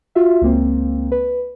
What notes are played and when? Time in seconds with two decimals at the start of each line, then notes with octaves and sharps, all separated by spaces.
0.15 F4 F#4 E5
0.42 C#2 A#3 C4
1.12 B4